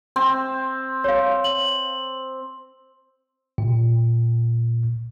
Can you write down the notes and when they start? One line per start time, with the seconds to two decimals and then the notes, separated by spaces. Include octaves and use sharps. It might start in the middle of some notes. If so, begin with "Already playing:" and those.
0.16 C4
1.04 C#5 F5
1.44 F#7
3.58 A#2